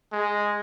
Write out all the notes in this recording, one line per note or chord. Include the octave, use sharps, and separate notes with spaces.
G#3